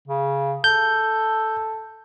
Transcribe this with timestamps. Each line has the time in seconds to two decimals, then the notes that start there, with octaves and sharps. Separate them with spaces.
0.07 C#3
0.64 A4 G6